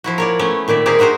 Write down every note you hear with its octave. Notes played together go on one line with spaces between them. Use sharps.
F3 E4 F#4
A#4 C#5 D5
A3 B3 C#4
A#2 D#3 D5 E5
C4 G4 G#4 A#4 C5 D5
C4 D#4 F#4 A#4 C5